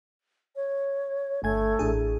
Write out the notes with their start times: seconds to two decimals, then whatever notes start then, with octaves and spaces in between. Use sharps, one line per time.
0.56 C#5
1.43 G1 A3 G#5 G#6
1.79 A1 D4 G#4